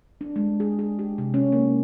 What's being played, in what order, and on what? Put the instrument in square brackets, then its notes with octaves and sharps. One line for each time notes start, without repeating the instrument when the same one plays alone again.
[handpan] D4
G#3
G#4
G#4
G4
C3
C#4
A#3